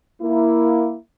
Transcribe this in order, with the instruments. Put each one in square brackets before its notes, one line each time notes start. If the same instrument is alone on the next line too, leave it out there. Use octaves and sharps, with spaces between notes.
[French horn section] A#3 E4